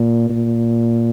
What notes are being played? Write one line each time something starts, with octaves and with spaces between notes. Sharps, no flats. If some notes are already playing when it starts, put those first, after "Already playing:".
Already playing: A#2
A#2